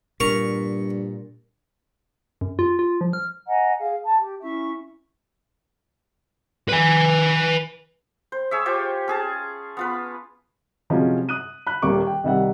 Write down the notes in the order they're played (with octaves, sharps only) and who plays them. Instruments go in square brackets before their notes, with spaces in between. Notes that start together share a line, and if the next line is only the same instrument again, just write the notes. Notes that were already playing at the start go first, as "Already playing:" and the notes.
[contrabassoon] G2 [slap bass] A#2 [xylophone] A#4 F7 [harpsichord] C#6
[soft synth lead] F#2
F4
F4
F3
F6
[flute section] D#5 F#5 G#5 A#5
G#4 F5
A5
G4
C#4 E4 E5 C#6
[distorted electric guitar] B4 G#5
[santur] C5
G#4 C#5 E5
F4 G4 C5 C#5
C#4 G#4 A5
B3 F4 B4
[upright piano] C3 F3 F#3 G#3 C#4
D#6 F#6 D#7
B5 F#6
D#1 G3 A#3 C#6 D6
G5
C2 D#3 G3 E5 F#5